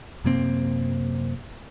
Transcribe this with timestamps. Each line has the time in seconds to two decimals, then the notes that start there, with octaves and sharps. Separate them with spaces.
0.24 F#2 C3 A#3 C4